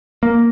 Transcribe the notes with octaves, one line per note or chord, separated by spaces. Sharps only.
A#3